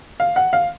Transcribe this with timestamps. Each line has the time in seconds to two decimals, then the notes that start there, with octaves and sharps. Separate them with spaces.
0.20 F5
0.36 F#5
0.53 F5